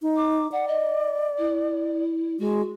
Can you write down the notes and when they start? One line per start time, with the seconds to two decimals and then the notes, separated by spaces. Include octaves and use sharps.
0.02 D#4
0.16 D6
0.52 D5 F#5
0.68 D#5
1.38 E4
2.39 G#3 F#4